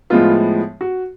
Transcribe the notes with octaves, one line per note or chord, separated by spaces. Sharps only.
A2 F3 G#3 B3 F4
F#4